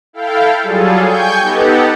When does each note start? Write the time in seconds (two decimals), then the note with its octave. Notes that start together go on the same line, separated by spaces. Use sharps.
0.13 E4 A4 F5 G5
0.62 F#3 G3 F4 G#4 A4
1.02 G5 G#5 C#6 G6
1.40 B3 D#4 G4 A4 F#5